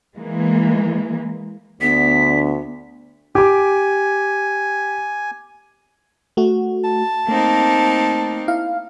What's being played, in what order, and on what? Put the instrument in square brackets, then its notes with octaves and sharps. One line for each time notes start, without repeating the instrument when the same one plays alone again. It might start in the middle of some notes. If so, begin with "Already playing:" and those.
[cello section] E3 G#3 A#3
[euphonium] D2 [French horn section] D3 D4 [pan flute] B3 [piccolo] B6
[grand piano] G4 D6 [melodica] G#5
[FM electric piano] A3 F#4
[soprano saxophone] A5
[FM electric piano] A3 [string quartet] A#3 C4 D#4
[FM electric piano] E4 F5